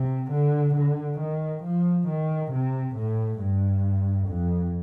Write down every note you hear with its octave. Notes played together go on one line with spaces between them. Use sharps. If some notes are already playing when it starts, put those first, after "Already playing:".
Already playing: C3
D3
D3
D#3
F3
D#3
C3
A2
G2
F2